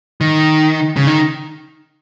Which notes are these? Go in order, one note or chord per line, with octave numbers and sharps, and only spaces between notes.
D#3
C#3
D#3